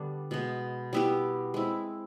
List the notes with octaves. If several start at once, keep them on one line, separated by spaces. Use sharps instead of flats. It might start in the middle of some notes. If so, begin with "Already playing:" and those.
Already playing: D3 G3 B3 D4
B2 G#3 B3
G3 B3 E4 G4
G#3 C4 E4